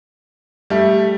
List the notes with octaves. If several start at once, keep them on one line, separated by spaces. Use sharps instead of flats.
G3 A3